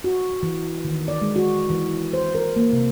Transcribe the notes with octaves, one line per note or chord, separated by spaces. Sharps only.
F#4
E3
D#3
D5
G#3
F#4
E3
C5
A#4
A#3
C3